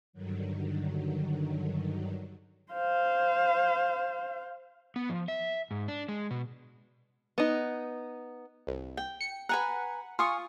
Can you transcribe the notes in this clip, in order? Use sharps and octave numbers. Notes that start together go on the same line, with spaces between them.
G2 D3 D#3 F#3
C5 F5
B3
F3
E5
G#2
D4
G#3
B2
B3 D#4
C2
G5
C#7
B4 F#5 G#5 A#5
F4 G#5 C#6 D#6